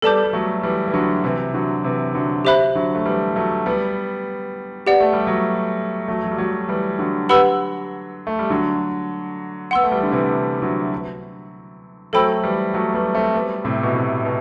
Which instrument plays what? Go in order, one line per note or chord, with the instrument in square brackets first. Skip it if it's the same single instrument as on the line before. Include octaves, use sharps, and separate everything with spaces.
[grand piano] G3 B3 [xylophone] A4 D5 A5 D6 G6
[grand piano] G3
F#3 A3
E3 G3
E3
D3 F#3
C3 E3
D3 F#3
C3 E3
D3 F#3
[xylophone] G4 C5 E5 B5 F#6
[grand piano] D3 F#3
A3
E3 G3
F#3 A3
G3 B3
[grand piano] B3 [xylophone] G4 D5 F#5
[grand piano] A3
G3
F#3 A3
F#3 A3
F#3
G3
F#3 A3
E3 G3
D3 F#3
[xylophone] G4 B4 F#5 B5 E6
[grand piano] A3
G3
D3 F#3
[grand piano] B3 [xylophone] F#5 C6 E6
[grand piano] A3
E3 G3
D3
C3 E3
D3 F#3
[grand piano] F#3 A3 [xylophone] A4 C5 G5 B5 E6
[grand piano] E3 G3
F#3 A3
G3 B3
A3 C4
G3 B3
A2 C3
B2
A2 C3
B2